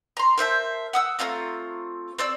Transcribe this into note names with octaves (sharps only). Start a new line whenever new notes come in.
A#5 C6
A#4 C5 E5 A5
F#5 D#6 E6
A3 C4 F4 A#5
C4 D5 E6